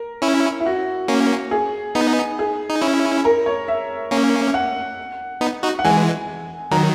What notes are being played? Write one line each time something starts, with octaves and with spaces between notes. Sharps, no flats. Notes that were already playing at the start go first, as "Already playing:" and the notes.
Already playing: A#4
C#4 E4
E4
F#4
A#3 C#4
G#4
B3 D#4
G#4
D#4
C#4 E4
A#4
C#5
E5
A#3 C#4
F#5
B3 D#4
D#4 F#4
F#5
E3 G#3 G#5
D#3 F#3 A#5